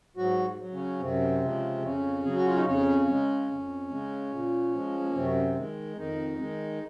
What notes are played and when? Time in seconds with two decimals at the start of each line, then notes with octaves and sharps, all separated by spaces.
0.17 G#2 F#3 F#4
0.59 F#3
0.72 C#3 C#4
1.00 F#2 C3 C4
1.42 C#3 F3 G#3
1.83 F2 C#3 C#4
2.24 C#3 F#3 G#4
2.36 F#4
2.45 F4
2.55 D#4
2.65 F2 C#3 C#4
3.07 C#3 G#3
3.48 F2
3.90 C#3 G#3
4.31 A#2
4.73 F3 G#3
4.99 G#3
5.06 A#3
5.13 F#2 C3 C4
5.55 D#3 G#3
5.97 F2 D#3 D#4
6.38 D#3 G#3